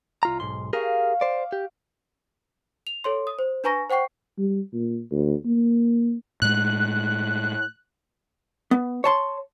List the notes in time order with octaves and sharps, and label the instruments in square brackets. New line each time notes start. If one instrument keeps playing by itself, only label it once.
[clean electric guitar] C2 F4 A#5
B1 G#2 C6
[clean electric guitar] G4 G#4 A#4 [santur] C#5 E5 F5
[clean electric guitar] C5 D5 [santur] D6
[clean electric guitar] G4
[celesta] F7
A4 C#5 C6
D#6
C5
D4 B4 G#5 A#5 C#6 A#6
C5 F#5 G5 C#6 C7
[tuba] G3
A#2
D2
A#3
[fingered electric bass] A2 G#3 [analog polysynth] F#6
[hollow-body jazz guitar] B3
C#5 A5 C6